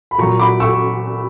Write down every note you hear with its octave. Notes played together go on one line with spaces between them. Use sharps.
B5
A#2 F#3 A#5 C#6
B5 D6
C#6 E6